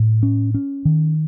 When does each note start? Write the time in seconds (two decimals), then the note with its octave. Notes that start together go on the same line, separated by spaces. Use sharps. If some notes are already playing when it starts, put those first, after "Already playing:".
Already playing: A2
0.23 C#4
0.54 C#4
0.85 D#3